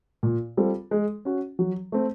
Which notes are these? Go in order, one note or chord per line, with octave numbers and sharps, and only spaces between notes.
A#2
G3 C4 F4 A4
G#3
C#4 F#4
F#3
A3 C4